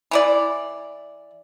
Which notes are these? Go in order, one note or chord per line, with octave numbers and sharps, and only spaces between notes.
E3 E4 D5